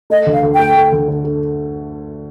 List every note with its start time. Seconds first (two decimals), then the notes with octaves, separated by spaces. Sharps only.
0.10 A3 D#5
0.26 D2
0.32 F5
0.43 D2
0.54 A3 G5
0.76 A3
0.92 D2
1.08 D3
1.24 D3